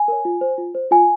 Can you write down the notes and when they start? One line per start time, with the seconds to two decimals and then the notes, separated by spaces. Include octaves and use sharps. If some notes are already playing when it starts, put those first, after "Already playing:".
Already playing: G#5
0.08 A#4 C#5
0.25 F4
0.41 C5
0.58 F4
0.75 C5
0.91 F4 G#5